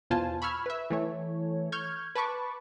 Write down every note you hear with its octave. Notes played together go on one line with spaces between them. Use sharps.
E2 B2 F4 C5 G#5 A5
B5 C#6 E6 F6 G#6
B4 E5
E3 A3 C#5
C#6 F6 G6 G#6
B4 A5 B5 C#6 D6